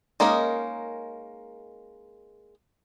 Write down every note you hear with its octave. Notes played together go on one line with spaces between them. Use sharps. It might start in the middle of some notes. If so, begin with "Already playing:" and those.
G#3 A#3 C#4 D#4 A#4